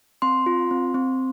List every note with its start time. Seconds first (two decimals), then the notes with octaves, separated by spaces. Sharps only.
0.22 C4 C6
0.46 F4
0.71 C4
0.94 C4